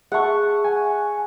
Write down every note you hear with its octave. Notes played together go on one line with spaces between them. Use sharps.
G#4 E5 F#5 A5 C#6
G#5